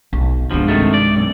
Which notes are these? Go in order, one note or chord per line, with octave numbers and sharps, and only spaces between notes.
B1
G2 B2 D#3 F3 G#3
C3 D#3 A3
D5
B1 F#2